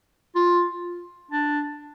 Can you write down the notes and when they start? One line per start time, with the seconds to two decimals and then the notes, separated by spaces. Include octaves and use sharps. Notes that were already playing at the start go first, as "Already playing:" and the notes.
0.35 F4
1.31 D4